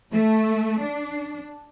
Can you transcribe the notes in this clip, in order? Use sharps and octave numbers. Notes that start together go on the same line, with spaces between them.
A3
D4